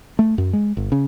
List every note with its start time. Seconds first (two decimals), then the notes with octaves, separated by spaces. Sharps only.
0.19 A3
0.38 F#2
0.53 G#3
0.77 G1
0.92 C#3